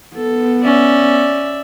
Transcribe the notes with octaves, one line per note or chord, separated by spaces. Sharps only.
B3 A4
C#4 D5 E5